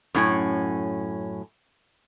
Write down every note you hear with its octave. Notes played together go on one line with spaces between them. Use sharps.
F#2 A2 C#4